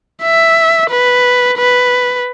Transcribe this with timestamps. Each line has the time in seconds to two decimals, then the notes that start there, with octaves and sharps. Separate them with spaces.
0.23 E5
0.90 B4
1.58 B4